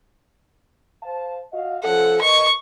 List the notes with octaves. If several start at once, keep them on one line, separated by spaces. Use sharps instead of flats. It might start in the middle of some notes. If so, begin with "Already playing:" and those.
C5 F5 A5
F#4 D#5 F5
F3 C#4 A4 F#5
A#4 B4 D#5 C#6